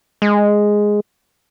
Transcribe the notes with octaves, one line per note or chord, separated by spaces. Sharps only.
G#3